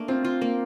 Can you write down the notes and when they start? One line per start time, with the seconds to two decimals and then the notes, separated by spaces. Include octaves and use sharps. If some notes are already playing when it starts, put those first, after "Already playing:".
Already playing: A3 A#3 D4
0.08 C4 F4
0.25 F4
0.41 A#3